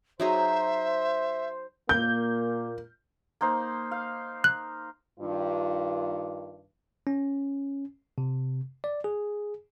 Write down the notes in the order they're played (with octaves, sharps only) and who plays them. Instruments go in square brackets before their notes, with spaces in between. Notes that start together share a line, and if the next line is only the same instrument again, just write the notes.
[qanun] F#3 D#4 G#4 [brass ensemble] C5 [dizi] E5
[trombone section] A#2 A#3 [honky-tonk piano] G6
[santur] A#3 D#4 C5
F5
[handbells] F#6
[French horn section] G2 D#3 F4
[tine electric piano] C#4
C3
D5
G#4